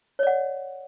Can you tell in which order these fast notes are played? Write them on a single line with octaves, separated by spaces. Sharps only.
C#5 D5 F#5